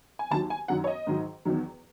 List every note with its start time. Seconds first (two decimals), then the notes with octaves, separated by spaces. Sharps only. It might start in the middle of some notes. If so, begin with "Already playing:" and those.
0.19 G#5
0.31 D#2 D#3 F#3 A5
0.50 G#5
0.68 F#2 D#3 F#3 F#5
0.84 C#5
0.87 D#5
1.07 G#2 D#3 F#3
1.45 E2 D#3 F#3